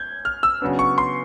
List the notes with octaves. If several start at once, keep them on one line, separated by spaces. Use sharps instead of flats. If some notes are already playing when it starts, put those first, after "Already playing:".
Already playing: G6 G#6
F6
E6
C#3 F#3 B3 D4
C#6
C6